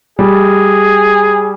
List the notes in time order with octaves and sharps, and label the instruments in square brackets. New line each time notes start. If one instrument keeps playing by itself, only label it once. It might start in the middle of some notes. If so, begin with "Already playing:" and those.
[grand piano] G3 [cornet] G#4